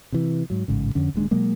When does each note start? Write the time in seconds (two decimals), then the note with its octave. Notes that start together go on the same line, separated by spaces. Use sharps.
0.12 C3 E3
0.50 G#2 F#3
0.68 A1 G#2 C#3
0.95 F2 D3 C#4
1.14 D1 D#2 G#3 D4
1.31 B2 F#3 G#3 A#3